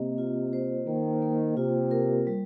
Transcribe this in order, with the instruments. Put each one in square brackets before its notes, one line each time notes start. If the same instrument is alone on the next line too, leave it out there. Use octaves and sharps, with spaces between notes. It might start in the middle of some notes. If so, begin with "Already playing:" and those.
Already playing: [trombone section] C3 [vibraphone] A#3 D#5
[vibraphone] F4
C5
[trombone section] D#3 [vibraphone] A#3
[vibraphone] A#3
[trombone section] C3 [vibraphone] F4
[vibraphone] A#4
G3